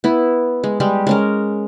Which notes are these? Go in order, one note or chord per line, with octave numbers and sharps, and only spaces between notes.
B3 E4
G#3
G3 G#3 G4
G#3 C#4 A#4